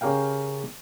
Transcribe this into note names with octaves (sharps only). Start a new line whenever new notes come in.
C#3 C#4 G4 A#4 F5 G5